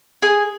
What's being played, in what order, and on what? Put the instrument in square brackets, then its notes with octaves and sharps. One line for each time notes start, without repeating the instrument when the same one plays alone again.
[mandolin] G#4